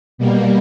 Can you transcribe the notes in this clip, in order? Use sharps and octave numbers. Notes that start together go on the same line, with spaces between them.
B2 G3 A#3